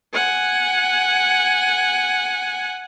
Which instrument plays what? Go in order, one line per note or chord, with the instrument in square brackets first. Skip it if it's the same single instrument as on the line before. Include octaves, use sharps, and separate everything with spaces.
[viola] F#5 G#5